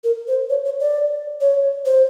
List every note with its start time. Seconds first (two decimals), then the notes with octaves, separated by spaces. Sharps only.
0.04 A#4
0.28 C5
0.50 C#5
0.65 C#5
0.80 D5
1.41 C#5
1.85 C5